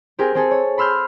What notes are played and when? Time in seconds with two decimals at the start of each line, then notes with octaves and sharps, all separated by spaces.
0.19 C4 G4 G#4 A#4
0.35 C4 G#4 A4
0.51 C#5
0.78 B5 C6 E6 F6 G6